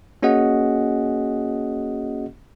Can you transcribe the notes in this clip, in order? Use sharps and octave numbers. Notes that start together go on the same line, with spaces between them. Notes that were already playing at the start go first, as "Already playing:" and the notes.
A#3 C#4 F#4 G#4 D#5 F#5